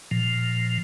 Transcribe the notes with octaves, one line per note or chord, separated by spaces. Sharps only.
A#2 F3